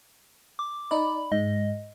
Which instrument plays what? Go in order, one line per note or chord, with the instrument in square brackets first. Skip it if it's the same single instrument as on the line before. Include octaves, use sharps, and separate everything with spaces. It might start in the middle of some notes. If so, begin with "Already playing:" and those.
[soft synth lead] D6
[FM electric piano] D#4 D5 [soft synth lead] B5
[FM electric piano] G#2 [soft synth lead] D#5